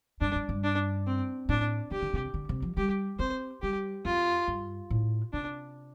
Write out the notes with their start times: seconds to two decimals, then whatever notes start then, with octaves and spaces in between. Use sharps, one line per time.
0.21 G2 D4
0.35 G2
0.49 G2
0.64 D4
1.07 C4
1.49 A2 D4
1.91 C3 G4
2.02 D3
2.13 C3
2.34 D3
2.49 C3
2.62 F3
2.77 G3 G4
3.19 C4 C5
3.62 G3 G4
4.05 F2 F4
4.48 G2
4.90 A2
5.33 C3 D4